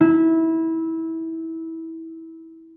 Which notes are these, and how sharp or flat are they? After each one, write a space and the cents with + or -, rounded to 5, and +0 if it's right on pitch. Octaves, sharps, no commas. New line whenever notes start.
E4 -20